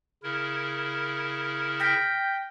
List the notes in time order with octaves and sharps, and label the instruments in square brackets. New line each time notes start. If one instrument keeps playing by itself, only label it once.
[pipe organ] C#3 E4 A#4
[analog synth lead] G5 [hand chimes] F6 A#6 B6